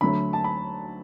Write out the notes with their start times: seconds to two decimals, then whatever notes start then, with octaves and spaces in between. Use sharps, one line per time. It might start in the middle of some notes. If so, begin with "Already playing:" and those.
0.01 D2 D3 F#3 A3 B5
0.33 A5
0.44 B5